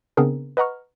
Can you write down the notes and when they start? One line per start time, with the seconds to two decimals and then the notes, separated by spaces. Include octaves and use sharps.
0.17 C#3 B3 C4 D4 G#4 A#4
0.57 B4 D#5 F#5 A#5 C#6 F6